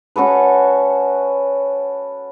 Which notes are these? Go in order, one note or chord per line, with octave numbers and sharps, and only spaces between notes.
C#4 F#4 A4 B4